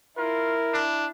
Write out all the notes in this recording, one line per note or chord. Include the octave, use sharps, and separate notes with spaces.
E4 F4 A#4
D4